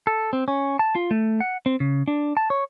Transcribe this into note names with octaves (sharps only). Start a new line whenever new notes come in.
A4
C4
C#4
A5
F4
A3
F#5
C4
C#3
D4
A5
C#5